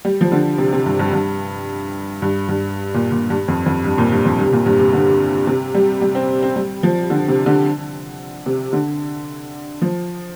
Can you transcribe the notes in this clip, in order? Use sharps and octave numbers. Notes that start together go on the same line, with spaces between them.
G3
F3
D3
C3
C3
G2
G2
G2
G2
G2
A#2
A#2
G2
F2
F2
G2
A#2
G2
F2
G2
C3
A#2
G2
C3
D3
C3
G3
G3
C4
C4
G3
F3
D3
C3
D3
C3
D3
F3